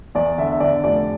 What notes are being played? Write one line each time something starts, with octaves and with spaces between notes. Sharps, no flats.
E2 D5
D3 E5
E5
D3 D5
F1 D5